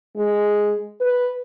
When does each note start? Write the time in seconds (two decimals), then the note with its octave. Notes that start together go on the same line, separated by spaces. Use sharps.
0.17 G#3
1.00 B4